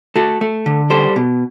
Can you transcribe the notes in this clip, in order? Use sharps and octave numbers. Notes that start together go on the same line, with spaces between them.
A3 F#4 A4
A3
D3
G3 A4 C5
B2